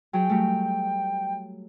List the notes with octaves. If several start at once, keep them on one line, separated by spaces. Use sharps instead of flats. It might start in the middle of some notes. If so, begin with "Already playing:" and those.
F#3 G#4 G5
F#3 G3 A3